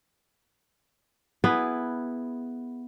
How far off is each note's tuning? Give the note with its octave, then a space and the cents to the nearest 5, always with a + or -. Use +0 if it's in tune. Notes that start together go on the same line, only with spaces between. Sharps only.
B3 +0 E4 +0 G#4 +0